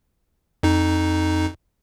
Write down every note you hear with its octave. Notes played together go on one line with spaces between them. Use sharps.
F2 D#4